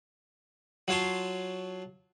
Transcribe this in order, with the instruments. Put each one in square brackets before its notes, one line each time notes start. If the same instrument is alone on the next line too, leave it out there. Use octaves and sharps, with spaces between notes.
[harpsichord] F#3 F4 C#5 A5 C6